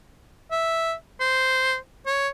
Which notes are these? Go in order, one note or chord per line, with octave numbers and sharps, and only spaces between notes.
E5
C5
C#5